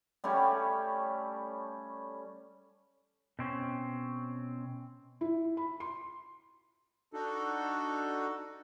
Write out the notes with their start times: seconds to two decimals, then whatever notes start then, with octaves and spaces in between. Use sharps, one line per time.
0.24 G3 A3 C#4 C#5
3.39 B2 C4 C#4
5.21 E4
5.57 B5
5.80 C6
7.13 D4 D#4 F#4 A4